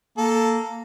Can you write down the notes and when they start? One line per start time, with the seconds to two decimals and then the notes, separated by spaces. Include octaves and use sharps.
0.18 A#3 A4